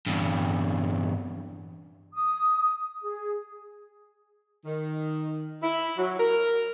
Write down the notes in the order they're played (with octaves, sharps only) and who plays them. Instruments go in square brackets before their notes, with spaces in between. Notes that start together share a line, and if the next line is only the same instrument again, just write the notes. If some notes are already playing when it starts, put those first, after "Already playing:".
[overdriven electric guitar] E2 G2
[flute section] D#6
G#4
[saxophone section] D#3
E4
F#3
A#4